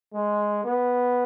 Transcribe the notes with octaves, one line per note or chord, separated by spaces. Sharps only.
G#3
B3